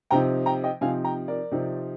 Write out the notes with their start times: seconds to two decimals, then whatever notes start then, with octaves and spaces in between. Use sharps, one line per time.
0.11 C3 F3 C4 D#4 G5 A#5
0.46 G5 A#5
0.64 D#5 G5
0.81 C3 F3 C4 D#4 F5 G#5
1.04 G5 A#5
1.28 A#4 D5
1.51 C3 F3 C4 D#4